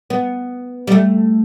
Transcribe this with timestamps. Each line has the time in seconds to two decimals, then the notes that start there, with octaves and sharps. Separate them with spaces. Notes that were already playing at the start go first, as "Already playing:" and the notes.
0.10 B3
0.87 G3
0.92 A3